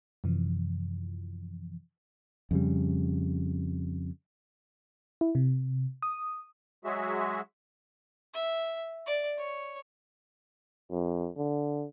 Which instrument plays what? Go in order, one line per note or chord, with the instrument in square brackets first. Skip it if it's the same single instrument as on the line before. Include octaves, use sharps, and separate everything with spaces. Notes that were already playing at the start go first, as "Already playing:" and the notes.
[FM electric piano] F#2 C3 E3 F3
[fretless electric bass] F2 C#3 G3
[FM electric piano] E4
C3
D#6
[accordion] F#3 G#3 F#4 G#4 E5
[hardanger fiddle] E5
D5
C#5
[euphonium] F2
D3